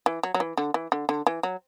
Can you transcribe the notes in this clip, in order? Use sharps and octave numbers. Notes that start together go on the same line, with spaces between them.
E3
F#3
F#3
E3
D3
E3
D3
D3
E3
F#3